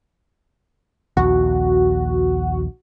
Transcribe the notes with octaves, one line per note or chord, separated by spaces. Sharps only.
A#1 D#2 F#4